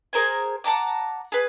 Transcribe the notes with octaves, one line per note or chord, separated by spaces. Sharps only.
G#4 A#4 C5 G#5
F#5 A5 A#5 D6
G#4 B4